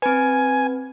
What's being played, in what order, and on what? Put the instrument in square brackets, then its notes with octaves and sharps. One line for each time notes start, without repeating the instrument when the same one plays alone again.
[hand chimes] C4 B4 [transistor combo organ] G#5